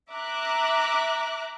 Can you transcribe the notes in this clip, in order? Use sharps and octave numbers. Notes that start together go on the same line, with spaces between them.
E5 A#5 D6 F#6